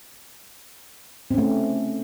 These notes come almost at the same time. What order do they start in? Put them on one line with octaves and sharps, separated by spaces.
C4 C#4 A3